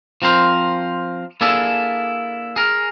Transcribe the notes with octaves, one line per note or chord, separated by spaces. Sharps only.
F3 C4 A#4 C5
A#3 D4 E4 G#4 A4
G#4 A#4